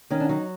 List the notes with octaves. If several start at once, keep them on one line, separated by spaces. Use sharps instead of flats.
D#3 C#4
D4
F#3 D#4